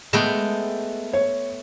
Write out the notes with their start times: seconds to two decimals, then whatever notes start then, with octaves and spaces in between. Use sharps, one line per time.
0.13 G#3 A3 B3 G5
1.13 C#5